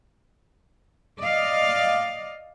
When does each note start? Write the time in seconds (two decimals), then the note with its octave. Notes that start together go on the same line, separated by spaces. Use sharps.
1.20 D5 D#5 F5